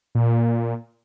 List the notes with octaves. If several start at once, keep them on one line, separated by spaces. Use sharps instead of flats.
A#2